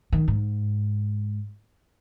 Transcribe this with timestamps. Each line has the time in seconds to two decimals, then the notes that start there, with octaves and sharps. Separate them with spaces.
0.12 D#3
0.28 G#2